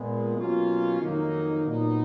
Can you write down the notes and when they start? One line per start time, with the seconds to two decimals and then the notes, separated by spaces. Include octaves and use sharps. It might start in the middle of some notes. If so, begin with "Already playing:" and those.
Already playing: A#2 G#3 B3
0.37 B2 F#3 A#3 C#4 F4
1.01 F2 D#3 F#3 A#3 D#4
1.65 A#2 F#3 B3 D#4